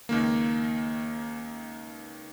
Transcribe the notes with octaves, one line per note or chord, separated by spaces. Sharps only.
C#2 D#3 A#3